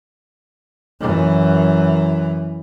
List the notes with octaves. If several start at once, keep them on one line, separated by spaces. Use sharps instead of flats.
F#2 E3